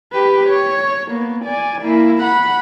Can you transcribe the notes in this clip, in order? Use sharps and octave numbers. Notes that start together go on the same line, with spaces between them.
G4 B4
C#5
A#3 B3
D5 G#5
A#3 E4
F#5 B5